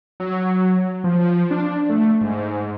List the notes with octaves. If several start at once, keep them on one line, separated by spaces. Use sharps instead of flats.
F#3
F3
D4
A3
G#2